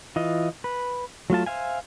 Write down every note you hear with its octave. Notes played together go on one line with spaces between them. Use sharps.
E3 F4 D#5
B4
F#3 A3 F4 A5
C5 E5 F5 G#5